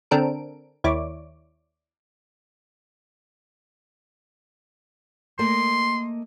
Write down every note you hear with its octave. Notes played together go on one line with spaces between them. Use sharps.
D3 C4 D4 A4 A#4 D7
D#2 E4 C#5 D5 D6
A3 A#3 D#5 C6